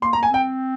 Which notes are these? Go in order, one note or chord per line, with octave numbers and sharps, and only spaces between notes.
A#3 C6
A#5
A#3
G#5
C4 G5